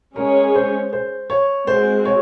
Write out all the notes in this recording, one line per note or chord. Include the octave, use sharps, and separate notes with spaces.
G#3 C#4 G#4 A#4 C#5
C5
C5
C#5
G#3 C4 F#4 C5
C#5